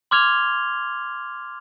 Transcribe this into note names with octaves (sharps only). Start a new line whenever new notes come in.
C6 D6 F6 G#6 F7 G7